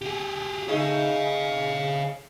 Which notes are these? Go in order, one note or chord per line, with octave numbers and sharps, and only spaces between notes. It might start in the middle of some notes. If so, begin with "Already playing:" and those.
G4 G#4
A3 D#4 G#4 C#5 F5